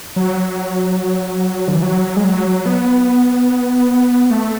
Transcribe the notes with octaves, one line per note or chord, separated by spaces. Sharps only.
F#3
D3
E3
F#3
G#3
F#3
B3
B3
A3